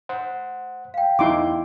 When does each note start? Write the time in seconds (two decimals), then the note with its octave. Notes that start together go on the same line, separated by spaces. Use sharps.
0.09 C5 F#5
0.94 F5 G5
1.19 E2 D#4 E4 C6 D6